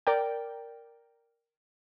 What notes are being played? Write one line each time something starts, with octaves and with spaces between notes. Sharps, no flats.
A#4 D5 G5